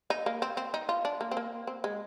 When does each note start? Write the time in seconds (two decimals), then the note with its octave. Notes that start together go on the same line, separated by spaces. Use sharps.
0.10 D#4
0.26 A#3
0.42 C4
0.57 C4
0.74 D#4
0.89 F4
1.05 D4
1.21 A#3
1.31 C4
1.37 A#3
1.67 C4
1.84 G#3